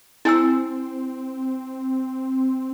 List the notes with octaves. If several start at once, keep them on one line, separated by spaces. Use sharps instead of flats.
C4 E4 G#5 E6